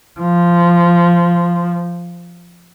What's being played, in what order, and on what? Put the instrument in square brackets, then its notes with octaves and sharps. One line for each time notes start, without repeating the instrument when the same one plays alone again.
[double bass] F3